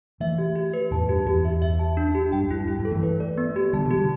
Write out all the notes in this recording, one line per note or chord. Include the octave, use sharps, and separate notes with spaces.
E3 A3 E5
G4
G4
B4
E2 A2 A5
G2 G4
E2 G4
E5
E5
A5
D4
G4
G2 G5
G2 E4
G2 E4
G2
A4
E3 A3
B4
D5
B3
G4
D3 G3 A5
B2 E3
G4
D3 G3